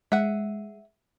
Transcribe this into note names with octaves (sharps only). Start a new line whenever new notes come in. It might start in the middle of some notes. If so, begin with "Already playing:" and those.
G#3 E5 F#5